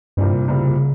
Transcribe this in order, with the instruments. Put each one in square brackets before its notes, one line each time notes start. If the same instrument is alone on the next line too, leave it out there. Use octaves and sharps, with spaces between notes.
[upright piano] C2 A#2 G3 C4 [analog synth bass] G2
[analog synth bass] C3
[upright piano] C2 A#2 G3 C4 [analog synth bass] C#3